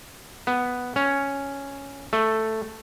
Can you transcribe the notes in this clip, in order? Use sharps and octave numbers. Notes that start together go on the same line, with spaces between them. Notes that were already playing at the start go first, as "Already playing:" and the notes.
B3
C#4
A3